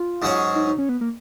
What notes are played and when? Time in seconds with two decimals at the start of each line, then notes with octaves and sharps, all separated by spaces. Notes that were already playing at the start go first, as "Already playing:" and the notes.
Already playing: F4
0.22 G#2 F#3 C#4 G#4 C#5
0.56 D#4
0.67 D#4
0.78 C#4
0.89 B3
1.01 A#3